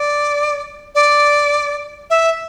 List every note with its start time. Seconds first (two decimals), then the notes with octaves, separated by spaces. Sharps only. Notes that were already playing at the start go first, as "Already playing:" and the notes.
Already playing: D5
0.95 D5
2.10 E5